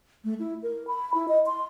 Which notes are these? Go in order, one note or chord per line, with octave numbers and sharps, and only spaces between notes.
A3
E4
A#4
B5
E4
D#5
C6